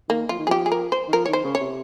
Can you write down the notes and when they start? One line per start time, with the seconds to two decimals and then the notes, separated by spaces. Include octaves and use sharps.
0.09 D#3 A#3
0.29 F3 F4
0.38 D#3
0.47 F3 G4 G#4
0.66 G#4
0.72 A#4
0.92 C5
1.08 D#3
1.13 F3 A#4
1.26 C#5
1.28 D#3
1.33 C5
1.44 C#3
1.55 C#5
1.60 C3